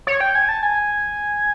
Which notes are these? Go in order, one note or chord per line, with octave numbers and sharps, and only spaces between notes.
C#5
G5
G#5
A5
G#5